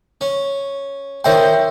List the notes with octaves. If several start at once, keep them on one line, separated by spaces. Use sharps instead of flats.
C#4
D#3 C5 C#5 E5 G5 C6